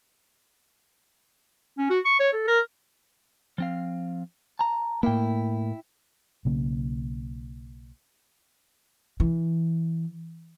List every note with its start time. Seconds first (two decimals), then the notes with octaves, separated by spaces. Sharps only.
1.78 C#4
1.90 F#4
2.05 C#6
2.20 C#5
2.33 A4
2.48 A#4
3.58 F3 C4 F5
4.59 A5 A#5
5.03 A2 A#3 E4 G5
6.45 B1 C#3 A#3
9.20 E3